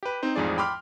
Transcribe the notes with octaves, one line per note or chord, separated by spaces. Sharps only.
G4 B4
C4 D#4 C5
A1 F2 G#2 F3 G#4 D5
G5 B5 C6 D6 F6